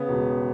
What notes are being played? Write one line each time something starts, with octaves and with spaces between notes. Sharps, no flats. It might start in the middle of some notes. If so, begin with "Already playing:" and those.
Already playing: C#3 B3
E1